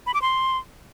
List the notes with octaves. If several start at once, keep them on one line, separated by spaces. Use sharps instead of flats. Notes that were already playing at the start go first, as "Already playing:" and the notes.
B5
D6
C6